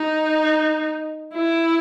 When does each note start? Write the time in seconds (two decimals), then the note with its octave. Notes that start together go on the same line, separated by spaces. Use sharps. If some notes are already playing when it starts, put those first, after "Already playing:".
Already playing: D#4
1.34 E4